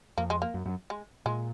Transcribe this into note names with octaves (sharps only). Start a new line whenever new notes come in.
F2 A#3
G#3
A#3
F#2
F#2
G#3
A#2 G#3